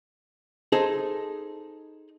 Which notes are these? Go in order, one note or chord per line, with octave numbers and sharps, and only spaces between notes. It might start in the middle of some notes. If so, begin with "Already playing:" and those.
D#4 G#4 A4 C5